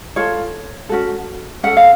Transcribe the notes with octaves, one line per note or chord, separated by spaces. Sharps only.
F4 A4 C#5
C#4 F#4 A4
C#4 A4 F#5
F5